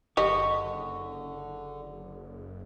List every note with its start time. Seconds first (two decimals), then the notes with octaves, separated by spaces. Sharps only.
0.17 F#1 D3 G4 D#5 C#6